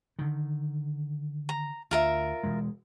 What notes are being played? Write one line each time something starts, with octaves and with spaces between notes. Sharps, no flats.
D3 D#3
A#5
D2 F4 A#4 E5
E1 E2 G#3